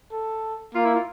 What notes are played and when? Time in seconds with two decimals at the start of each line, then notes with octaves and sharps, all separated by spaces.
0.12 A4
0.74 A#3 F4
0.85 E4
0.96 F4